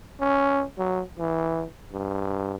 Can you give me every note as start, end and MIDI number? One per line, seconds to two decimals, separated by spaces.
0.20 0.64 61
0.78 1.02 54
1.18 1.64 52
1.92 2.57 43